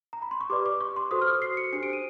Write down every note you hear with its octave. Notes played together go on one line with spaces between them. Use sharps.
A#5
B5
C6
C#6
G4 B4 D5 D6
D6
C#6
C6
F#4 A4 C5 D#6
F6
C7
C#7
D4 G4 C5 C#7
D7
D#7